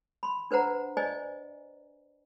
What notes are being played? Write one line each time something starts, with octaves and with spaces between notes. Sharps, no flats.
B5 C6
D4 B4 C5 F#5 A#5
C5 D5 D#5 G#5